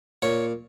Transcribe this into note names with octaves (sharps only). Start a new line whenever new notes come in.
A#2 C#5